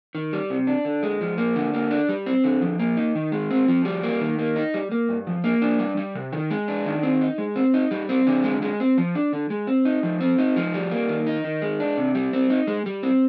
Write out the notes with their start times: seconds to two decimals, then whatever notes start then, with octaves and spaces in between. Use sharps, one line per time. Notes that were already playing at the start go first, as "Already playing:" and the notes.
0.15 D#3
0.33 G3
0.50 C3
0.67 D4
0.85 D3
1.03 G#3
1.21 F3
1.38 A#3
1.56 D3
1.74 A#3
1.91 D4
2.09 G3
2.26 C4
2.44 D3
2.62 F3
2.79 A#3
2.97 D#4
3.15 D#3
3.32 G#3
3.50 C4
3.68 F3
3.85 G3
4.03 A#3
4.21 D#3
4.39 A#3
4.56 D#4
4.74 G3
4.92 A#3
5.09 G2
5.27 F3
5.44 A#3
5.62 D4
5.79 G3
5.97 G3
6.15 C3
6.32 D#3
6.51 G#3
6.68 D4
6.86 D#3
7.03 C4
7.21 D#4
7.38 G#3
7.56 C4
7.74 D#4
7.91 G3
8.09 C4
8.27 D3
8.44 G#3
8.62 G#3
8.80 C4
8.98 F3
9.15 D4
9.33 D3
9.50 G#3
9.67 C4
9.85 D#4
10.03 F3
10.21 C4
10.38 D#4
10.56 F3
10.74 G3
10.91 A#3
11.09 D#3
11.27 D#4
11.44 D#3
11.62 G#3
11.80 D4
11.97 C3
12.15 G3
12.33 C4
12.50 D#4
12.67 G#3
12.86 G3
13.03 C4